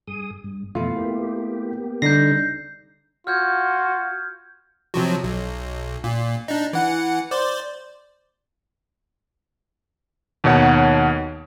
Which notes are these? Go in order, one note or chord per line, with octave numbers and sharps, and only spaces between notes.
G2 G#4 D#6
G2
F2 B2 E3 A3 E4 F4
A#3 B3 G4
D3 G3 D#4 G6 A#6 C7
F4 F#4 F6 G6 G#6
C3 F3 F#3
B1
A#2
D4 D#4
E3 F#5
C5 D5
D#2 B2 D#4 C#5 F#5